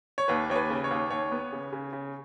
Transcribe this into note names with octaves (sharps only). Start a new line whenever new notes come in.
C#5
D#2 B4
D#2 C#5
B4
C#3
C#5
D#2
D#2 C#5
B3
C#3
C#3
C#3